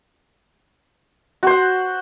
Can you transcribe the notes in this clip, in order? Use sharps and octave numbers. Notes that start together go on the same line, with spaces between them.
F#4 C5 F#5